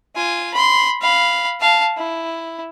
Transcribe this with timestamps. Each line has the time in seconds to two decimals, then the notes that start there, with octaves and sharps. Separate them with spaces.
0.15 F4 G#5
0.54 B5 C6
1.01 F5 B5
1.61 F5 A5
1.97 E4